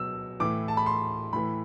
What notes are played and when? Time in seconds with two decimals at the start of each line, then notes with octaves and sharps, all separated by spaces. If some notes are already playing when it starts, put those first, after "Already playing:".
Already playing: B2 F#3 E6
0.40 A2 E3 D6
0.68 A5
0.77 B5
0.86 C6
1.33 A2 E3 B5